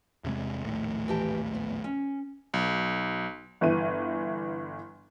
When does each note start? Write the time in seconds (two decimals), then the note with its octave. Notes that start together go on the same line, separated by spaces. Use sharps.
0.24 E2 C3 G#3
0.64 A#1 D#2 A2
1.08 E3 G4 A5
1.55 B3
1.84 C#4
2.54 B1
3.61 G1 E3 D#7